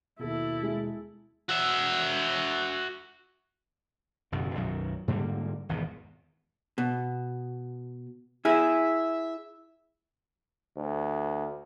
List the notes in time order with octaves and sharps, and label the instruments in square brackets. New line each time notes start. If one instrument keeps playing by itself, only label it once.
[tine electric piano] D#2 B2 [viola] E4 A4
[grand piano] G#3
[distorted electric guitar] F#4 E5
[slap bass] F#1 F#2 B2 D#3
B1 F#2 D#3 F#3
G#2 D3 G3 A#3
G#1 E2 B2
[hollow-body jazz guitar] B2
[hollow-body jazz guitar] E4 G#4 [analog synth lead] E5
[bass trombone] D2